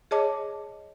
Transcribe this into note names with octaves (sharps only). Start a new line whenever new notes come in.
G#4 C#5 D#5 A5 D6